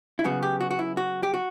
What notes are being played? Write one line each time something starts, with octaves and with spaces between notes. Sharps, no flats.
E4
C#3 F#3 B3 F#4
G4
F#4
F#4
E4
F#4
G4
F#4